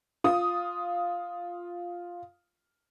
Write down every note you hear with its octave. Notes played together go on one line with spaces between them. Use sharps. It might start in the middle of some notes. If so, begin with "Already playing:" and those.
F4 D#6